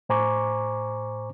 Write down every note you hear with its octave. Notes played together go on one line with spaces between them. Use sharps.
A2 C5 G#5 A#5 C#6 D6